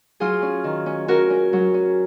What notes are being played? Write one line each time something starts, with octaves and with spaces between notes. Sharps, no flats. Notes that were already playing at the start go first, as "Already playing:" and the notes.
F#3 F4 G#4
C#4
D#3
C#4
C#4 F#4 A#4
C#4
F#3
C#4